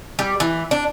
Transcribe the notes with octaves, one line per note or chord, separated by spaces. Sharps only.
G3
E3
D4